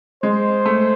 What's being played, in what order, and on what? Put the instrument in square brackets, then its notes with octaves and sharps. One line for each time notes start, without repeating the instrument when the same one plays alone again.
[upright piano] G#3 [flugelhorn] C5
[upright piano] A3